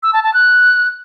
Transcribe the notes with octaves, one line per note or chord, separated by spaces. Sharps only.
E6
A5
A5
F#6